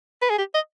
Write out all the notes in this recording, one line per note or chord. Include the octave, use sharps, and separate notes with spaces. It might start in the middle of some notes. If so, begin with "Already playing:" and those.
B4
G#4
G4
D#5